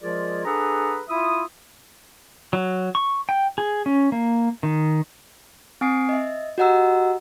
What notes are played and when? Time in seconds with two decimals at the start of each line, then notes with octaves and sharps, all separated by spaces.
0.01 F3 G#3 F4 G#4 A#4 D5
0.45 D4 G#4 A4 B4 F#5 A#5
1.09 E4 F4 E5 D#6
2.53 F#3
2.95 C#6
3.29 G5
3.58 G#4
3.86 C#4
4.12 A#3
4.63 D#3
5.81 C4 G#5 D#6 C7 D7
6.09 D#5 E5
6.58 F#4 G4 D#5 F#5 A#5 E6